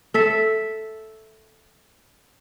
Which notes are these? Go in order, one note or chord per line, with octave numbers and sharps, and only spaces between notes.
A4 E5